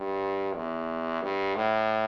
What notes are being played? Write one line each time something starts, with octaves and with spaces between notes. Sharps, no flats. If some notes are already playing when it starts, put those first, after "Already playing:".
Already playing: G2
E2
G2
A2